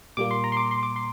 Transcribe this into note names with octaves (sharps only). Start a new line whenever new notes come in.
A#2 G3 A#3 D6
C6
A#5
C6
D6
C6
D6
C6